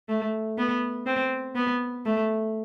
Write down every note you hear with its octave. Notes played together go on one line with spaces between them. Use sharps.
A3
B3
C4
B3
A3